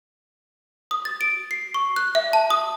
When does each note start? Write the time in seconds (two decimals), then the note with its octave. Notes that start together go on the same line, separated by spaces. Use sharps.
0.91 D#6
1.05 A6
1.21 D7
1.51 C7
1.74 C#6
1.96 F#6
2.15 E5
2.33 A5
2.50 D#6